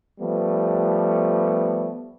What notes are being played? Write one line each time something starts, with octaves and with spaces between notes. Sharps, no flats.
F3 G3 A3 B3